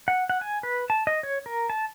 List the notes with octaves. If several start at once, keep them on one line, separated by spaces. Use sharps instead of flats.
F#5
F#5
G#5
B4
A5
D#5
C#5
A#4
A5